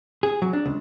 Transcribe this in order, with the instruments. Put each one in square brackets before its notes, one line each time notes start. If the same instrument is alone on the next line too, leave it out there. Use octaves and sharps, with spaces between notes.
[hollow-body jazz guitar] G#4
F#3
D4
C#2